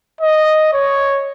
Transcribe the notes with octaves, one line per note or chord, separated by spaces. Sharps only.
D#5
C#5